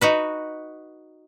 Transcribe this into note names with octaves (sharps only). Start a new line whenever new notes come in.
D#4 F#4 B4